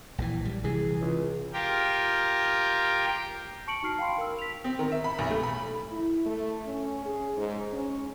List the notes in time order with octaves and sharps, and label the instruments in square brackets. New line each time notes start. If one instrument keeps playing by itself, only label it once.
[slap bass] A#1 D3 E3
G3
[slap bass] C3 E3 [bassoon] G#4
[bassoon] C#2
[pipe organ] F4 G4 A#4 G5
[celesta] A5 C#6 C#7 D7 F#7
D#4 F#4 A5 F6 C7 D7
F5 G5 B5 C6
A#4 E6
B6 F7
[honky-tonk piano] C4
D#3
E5
B5
B1
A3
B5
[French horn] E4
A3
C#4
G#4
G#2
C#4